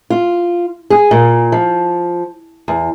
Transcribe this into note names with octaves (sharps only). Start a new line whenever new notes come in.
F4
G#4
A#2
F3
E2